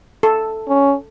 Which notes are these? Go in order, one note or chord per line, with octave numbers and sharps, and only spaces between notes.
A4
C#4